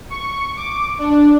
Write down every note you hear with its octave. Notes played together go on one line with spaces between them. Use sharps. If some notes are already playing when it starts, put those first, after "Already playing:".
C#6
D6
D4